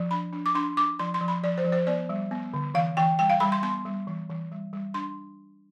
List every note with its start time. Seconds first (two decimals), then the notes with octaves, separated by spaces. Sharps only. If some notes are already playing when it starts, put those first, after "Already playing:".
Already playing: F3
0.11 D4 B5
0.33 D4
0.46 D6
0.55 D4 C6
0.77 D4 D6
0.99 F3 C6
1.14 C6
1.21 F3
1.28 B5
1.44 F3 D5
1.58 C5
1.65 F3
1.72 C5
1.87 B3 D5
2.09 G3
2.31 B3
2.54 D3
2.75 E3 F5
2.97 E3 G5
3.19 G3 G5
3.30 F5
3.40 G3 B5
3.52 C6
3.63 B3 C6
3.85 G3
4.07 E3
4.29 E3
4.51 G3
4.73 G3
4.94 D4 C6